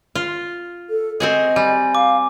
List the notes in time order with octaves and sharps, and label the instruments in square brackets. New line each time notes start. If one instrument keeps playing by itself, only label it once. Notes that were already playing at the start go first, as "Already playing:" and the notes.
[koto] F4
[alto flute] A4
[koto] C4 F#4 G#4 [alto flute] D#5
[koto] G3 [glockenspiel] G#5
[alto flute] F5 [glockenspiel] D6